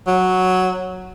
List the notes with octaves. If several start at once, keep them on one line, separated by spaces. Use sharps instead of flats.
F#3